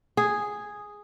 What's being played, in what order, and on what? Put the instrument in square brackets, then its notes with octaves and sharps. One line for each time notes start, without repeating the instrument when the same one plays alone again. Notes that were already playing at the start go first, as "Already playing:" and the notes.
[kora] G#4